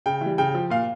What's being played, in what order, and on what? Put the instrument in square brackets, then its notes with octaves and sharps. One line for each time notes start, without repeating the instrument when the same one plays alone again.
[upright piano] C#3 G5
E3 G3
C#3 G5
F3
A#2 F5